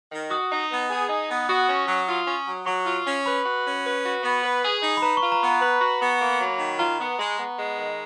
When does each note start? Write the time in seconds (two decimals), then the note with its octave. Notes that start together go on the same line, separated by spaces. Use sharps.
0.12 D#3
0.30 F#4 D#6
0.51 D#4
0.71 B3
0.90 G#4
1.09 D#4
1.29 B3
1.49 F#4 D#6
1.69 C#4
1.88 F#3
2.08 F4
2.27 C#4
2.47 F#3
2.66 F#3 C#6
2.86 F4
3.07 C#4
3.26 B4 B5
3.46 F#4
3.66 C#4
3.85 B4
4.05 F#4
4.24 B3
4.44 B4
4.64 G#4
4.82 D#4
4.97 B5
5.03 B4 A#5
5.17 C#6
5.22 F4
5.32 A#5
5.41 B3
5.47 A#5
5.61 B4 B5
5.81 F#4
6.01 B3
6.20 A#3
6.40 F#3
6.59 D#3
6.79 F4 A#5
6.99 B3
7.19 G#3
7.39 B3
7.58 G#3
7.78 D#3